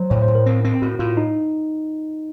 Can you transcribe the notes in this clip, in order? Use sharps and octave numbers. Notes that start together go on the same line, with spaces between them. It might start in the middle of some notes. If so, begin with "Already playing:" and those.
Already playing: F#3 C5
A2 C#5
C5
A2
A#4
C4
C4
A2 F#4
A2 F4
D#4